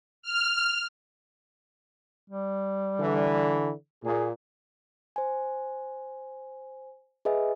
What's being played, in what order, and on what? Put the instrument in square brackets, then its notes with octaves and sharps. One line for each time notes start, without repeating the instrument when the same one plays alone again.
[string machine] F6
[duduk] G3
[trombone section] D3 E3
[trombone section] A#2 [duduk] G#4
[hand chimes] C5 G#5
G#4 B4 D#5 E5 G#5